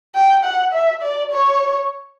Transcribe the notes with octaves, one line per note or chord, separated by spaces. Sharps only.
G5
F#5
E5
D5
C#5